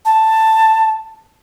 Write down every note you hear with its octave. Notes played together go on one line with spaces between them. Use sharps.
A5